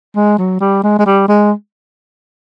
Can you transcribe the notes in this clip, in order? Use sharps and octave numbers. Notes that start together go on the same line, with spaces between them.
G#3
F#3
G3
G#3
G#3
G3
G#3